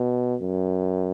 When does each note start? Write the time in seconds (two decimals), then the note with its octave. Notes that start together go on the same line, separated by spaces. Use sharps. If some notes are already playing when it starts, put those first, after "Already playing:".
Already playing: B2
0.41 F#2